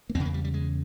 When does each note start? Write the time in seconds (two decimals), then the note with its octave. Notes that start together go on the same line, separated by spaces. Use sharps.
0.10 A#3
0.15 E2 C#3 C4
0.25 A#3
0.34 G3
0.44 G3
0.54 G#3